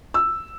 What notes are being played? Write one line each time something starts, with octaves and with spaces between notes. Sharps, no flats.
E6